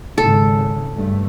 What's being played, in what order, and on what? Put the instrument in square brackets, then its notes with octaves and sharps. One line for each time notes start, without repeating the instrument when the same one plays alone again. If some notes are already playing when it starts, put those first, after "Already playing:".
[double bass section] G#1 C#3 [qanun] A4
[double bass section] G2 A3